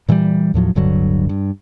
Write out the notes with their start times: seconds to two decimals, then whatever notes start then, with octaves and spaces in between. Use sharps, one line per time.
0.09 A#2 E3 F3 G3
0.54 D#2 A2 F3 F#3
0.75 D1 G2 D3 F#3
1.29 G2